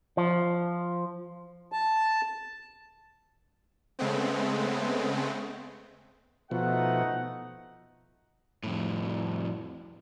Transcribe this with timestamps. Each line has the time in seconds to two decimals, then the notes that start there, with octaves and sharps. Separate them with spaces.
0.17 F3
1.72 A5
3.99 C#3 G#3 A3 B3 C4
6.51 B2 F3 A3 D#4 F#5
8.63 F2 A2